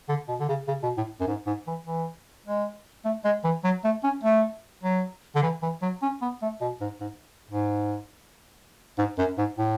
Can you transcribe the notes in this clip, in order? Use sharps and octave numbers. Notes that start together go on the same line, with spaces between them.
D3
B2
D3
C#3
C#3
B2
A2
F#2
G#2
G#2
E3
E3
G#3
A3
G#3
E3
F#3
A3
C#4
A3
F#3
D3
E3
E3
F#3
C#4
B3
A3
B2
G#2
G#2
G#2
G#2
F#2
G#2
A2